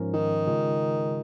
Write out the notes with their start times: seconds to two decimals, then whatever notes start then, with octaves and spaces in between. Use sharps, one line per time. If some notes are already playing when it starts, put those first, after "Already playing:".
Already playing: G#2 F3 C#4 A#4
0.14 D#3
0.47 C#3 G#3 F4 G#4